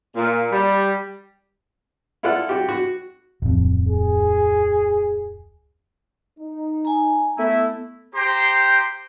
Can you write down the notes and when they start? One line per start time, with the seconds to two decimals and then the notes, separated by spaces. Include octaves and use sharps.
0.16 A#2
0.52 G3
2.23 E4 F4 A4 D5 F#5
2.49 F#4 G4
2.69 F#4
3.42 D1 F2
3.89 G#4
6.39 D#4
6.85 G#5 A#5
7.38 A3 B3 E4
8.15 G4 C5 G5 A#5 C6